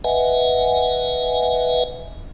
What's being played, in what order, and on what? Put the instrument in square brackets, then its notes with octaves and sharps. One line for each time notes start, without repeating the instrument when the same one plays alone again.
[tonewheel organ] B4 D#5 E5 F#5 G#5